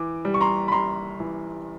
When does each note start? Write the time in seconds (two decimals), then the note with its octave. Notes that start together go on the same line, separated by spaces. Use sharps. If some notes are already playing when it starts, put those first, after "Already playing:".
Already playing: E3 D6
0.25 G3
0.34 C#6
0.41 A#5 C6
0.68 B5
0.72 G3 A#5 C6
1.20 E3